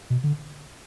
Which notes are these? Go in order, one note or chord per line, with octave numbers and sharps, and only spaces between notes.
B2
D3